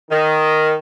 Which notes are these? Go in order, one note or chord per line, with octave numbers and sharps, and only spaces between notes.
D#3